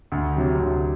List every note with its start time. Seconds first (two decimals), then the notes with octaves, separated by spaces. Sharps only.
0.12 D2
0.36 C3 F#3
0.60 D2